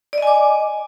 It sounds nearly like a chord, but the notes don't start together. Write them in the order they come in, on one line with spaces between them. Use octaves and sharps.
D5 D#5 G#5 D6